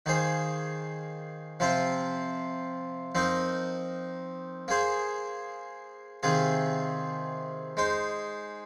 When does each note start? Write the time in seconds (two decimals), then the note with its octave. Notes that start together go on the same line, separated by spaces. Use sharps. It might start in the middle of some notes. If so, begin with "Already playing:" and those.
0.06 D#3 A#3 G#4 C5
1.60 C3 F3 C4 F4 C5
3.15 F3 C4 D#4 A#4
4.68 A#3 G#4 C5
6.23 C3 D#3 C4 F4 G#4
7.77 G#3 D#4 C5